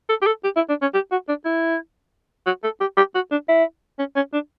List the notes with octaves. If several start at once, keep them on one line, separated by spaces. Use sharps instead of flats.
A4
G4
A4
G4
E4
D4
C#4
G4
F#4
D4
E4
F#4
A4
G4
G4
F#4
D4
E4
C#4
C#4
D4